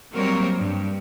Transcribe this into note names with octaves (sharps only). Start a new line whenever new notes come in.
F#3 G3 A#3 C4 A#4 C#5
G2